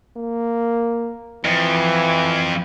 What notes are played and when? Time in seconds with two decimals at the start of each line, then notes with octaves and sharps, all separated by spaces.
0.17 A#3
1.45 F2 E3